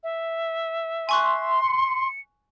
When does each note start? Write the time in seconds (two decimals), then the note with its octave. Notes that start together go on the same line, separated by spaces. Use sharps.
0.04 E5
1.09 G#5 C6 C#6 F#6
1.63 C#7